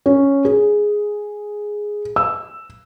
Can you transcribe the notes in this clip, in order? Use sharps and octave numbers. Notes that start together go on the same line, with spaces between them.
C#4
G#4
E6